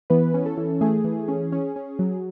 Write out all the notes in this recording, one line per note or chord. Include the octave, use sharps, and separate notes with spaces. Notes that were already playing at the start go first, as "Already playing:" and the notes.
E3 B3 B4
C#4
A4
E3
A3 G#4
E3
C#4
C#4
C#4
F#3